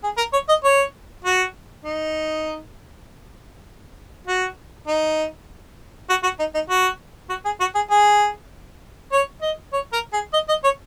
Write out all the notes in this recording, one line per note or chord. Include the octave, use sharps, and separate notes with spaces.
G#4
A#4
C#5
D#5
C#5
F#4
D#4
F#4
D#4
F#4
F#4
D#4
D#4
F#4
F#4
G#4
F#4
G#4
G#4
C#5
D#5
C#5
A#4
G#4
D#5
D#5
C#5